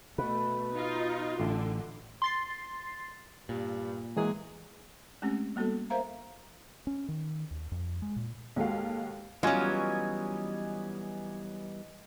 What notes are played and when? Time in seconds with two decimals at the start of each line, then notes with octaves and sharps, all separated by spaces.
0.18 B2 A3 B4
0.74 D#4 F4
1.40 A1 D3 C6
2.22 C6 A6 C7
3.49 G2 A#2
4.17 E3 F#3 G#3 A#3 G#4
5.22 G#3 A3 C4 C#4 G4
5.56 G3 A#3 B3 F#4 A4
5.90 A#4 C5 E5 F5 A#5
6.87 C#4
7.08 D#3
7.51 D#2
7.72 F2
8.02 G#3
8.16 A#2
8.56 D#2 G#3 F#4 A4 F5
9.43 E3 F#3 G3 B3 C#4 F4 D#5 G#5